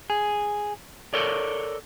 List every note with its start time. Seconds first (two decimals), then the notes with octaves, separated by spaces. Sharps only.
0.10 G#4
1.14 A4 A#4 C#5 D5